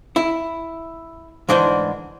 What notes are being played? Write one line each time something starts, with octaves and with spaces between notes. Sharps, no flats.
E4
D2 G#2 E3 D4 C5